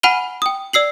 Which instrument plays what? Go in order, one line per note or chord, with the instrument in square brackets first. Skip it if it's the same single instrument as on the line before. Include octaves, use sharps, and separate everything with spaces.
[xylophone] F#5 G#5 B5 F6 D#7 G7
G5 D#6
D5 E6 C7 F#7